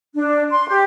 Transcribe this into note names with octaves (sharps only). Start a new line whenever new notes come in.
D4
C6
G4